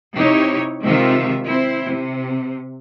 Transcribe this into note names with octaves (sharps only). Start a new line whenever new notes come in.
C3 D#4 E4 G4 C#5
C3 D#3 G#3 F4 E5
C4 E4 C5
C3